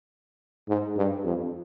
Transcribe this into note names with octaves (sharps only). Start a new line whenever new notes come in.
G#2
G2
F2